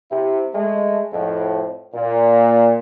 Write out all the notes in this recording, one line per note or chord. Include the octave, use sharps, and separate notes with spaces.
C3 E4
G#3 A3
F2 A2
A#2